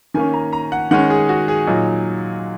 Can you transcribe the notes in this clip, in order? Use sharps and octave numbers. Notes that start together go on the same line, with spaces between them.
D#3 A#3 C#4 G#5
A#5
A#5
F#5
D#3 G#3 C#4 F#5
G#4
F#4
G#4
A#2 F#3 D#4